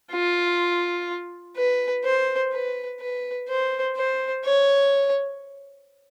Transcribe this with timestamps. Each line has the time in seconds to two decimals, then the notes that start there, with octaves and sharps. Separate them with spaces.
0.12 F4
1.56 B4
2.04 C5
2.52 B4
3.00 B4
3.48 C5
3.96 C5
4.44 C#5